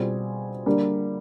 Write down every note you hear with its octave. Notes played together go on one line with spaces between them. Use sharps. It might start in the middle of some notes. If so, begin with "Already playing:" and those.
Already playing: B2 G3 C4 F4 G#4
D3 G3 A#3